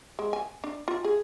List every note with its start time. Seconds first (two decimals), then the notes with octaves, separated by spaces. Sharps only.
0.19 G#3
0.33 G#5
0.64 D4
0.88 F4
1.05 G#4